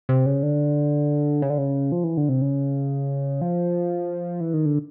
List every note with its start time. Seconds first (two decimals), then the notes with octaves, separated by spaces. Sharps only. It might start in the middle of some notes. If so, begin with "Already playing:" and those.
0.09 C3
0.26 C#3
0.43 D3
1.42 C#3
1.50 D3
1.58 C#3
1.92 F3
2.04 E3
2.17 D3
2.29 C3
2.42 C#3
3.41 F3
4.41 E3
4.54 D#3
4.65 D3